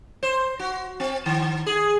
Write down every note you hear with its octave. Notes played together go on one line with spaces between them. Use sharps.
C5
F#4
C4
D#3
G#4